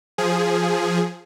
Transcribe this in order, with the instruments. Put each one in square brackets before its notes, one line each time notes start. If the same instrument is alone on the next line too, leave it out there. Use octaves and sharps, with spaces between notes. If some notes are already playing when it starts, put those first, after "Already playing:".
[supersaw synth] F3 G#4